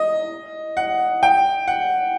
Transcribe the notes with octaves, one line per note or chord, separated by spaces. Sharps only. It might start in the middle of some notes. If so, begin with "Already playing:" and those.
Already playing: D#5
F#5
G5
F#5